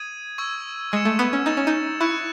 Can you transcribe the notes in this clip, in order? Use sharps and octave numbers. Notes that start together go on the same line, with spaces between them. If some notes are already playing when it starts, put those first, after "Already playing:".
Already playing: D#6 G#6 D#7
C#6 E6 G#6
G#3 E6 G#6 C#7 E7
A3
B3
C#4
D#4 D#6 A6 E7
C#4
D#4
E4 C#6 F#6 C#7